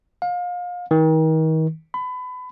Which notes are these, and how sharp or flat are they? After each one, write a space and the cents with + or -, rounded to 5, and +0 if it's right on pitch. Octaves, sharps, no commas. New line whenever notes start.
F5 +30
D#3 +35
B5 +25